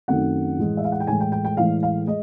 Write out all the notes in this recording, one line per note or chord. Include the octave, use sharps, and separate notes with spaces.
F#2 D#3 F#3 A3 C4 F#5
A2 E3 G#3
E5
F5
F#5
G5
A2 E3 G#3 G#5
G5
G5
G5
A2 E3 G#3 F5
F5
G#3 D#5